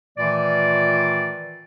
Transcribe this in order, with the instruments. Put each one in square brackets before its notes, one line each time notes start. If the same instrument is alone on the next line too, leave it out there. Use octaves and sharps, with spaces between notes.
[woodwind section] A#2 D#3 E3 A3 F4 D5